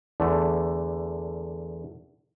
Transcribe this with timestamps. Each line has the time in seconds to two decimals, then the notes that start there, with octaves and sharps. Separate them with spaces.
0.20 E2 D3 A3